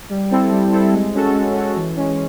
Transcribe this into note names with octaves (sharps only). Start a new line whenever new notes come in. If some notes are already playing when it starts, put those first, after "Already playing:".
G3
C4 E4 A4
G3
C4 E4 A4
G#3
C#4 F#4 A4
G#3
C#4 F#4 A4
E3
G#3 C#4